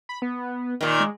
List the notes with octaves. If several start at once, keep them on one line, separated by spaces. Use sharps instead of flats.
B5
B3
A#2 D#3
G#3